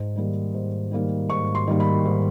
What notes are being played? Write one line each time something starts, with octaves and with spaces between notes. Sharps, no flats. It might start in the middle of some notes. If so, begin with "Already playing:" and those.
Already playing: G#2
D#3 G3 A#3
G#2
D#3 G3 A#3
G#2 C#6
C6
D#3 G3 A#3
B5
G#2